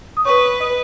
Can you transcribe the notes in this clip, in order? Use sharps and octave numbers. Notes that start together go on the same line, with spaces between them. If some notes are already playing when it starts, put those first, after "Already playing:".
D#6
B4 C#5 C#6
D#5 D#6